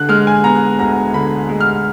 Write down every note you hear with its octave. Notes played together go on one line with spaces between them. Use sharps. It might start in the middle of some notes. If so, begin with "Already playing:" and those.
Already playing: D3 F#6
G#3 F6
G#5
B3 A#5
D2 A#5
D3 B5
G#3
F6